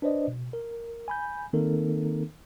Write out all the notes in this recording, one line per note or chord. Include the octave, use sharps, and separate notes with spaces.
D4 B4 C5 D5 D#5
B2
A#4
G#5 B5 G6
D#3 A#3 C4 D#4 A4 A#4